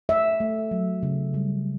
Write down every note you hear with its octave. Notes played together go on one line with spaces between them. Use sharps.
A3 E5
A3
F#3
C#3
G3